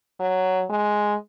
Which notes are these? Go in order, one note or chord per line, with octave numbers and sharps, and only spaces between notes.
F#3
G#3